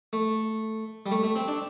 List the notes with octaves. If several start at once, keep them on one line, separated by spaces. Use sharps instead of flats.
A3
G3
A3
A3
C4
D4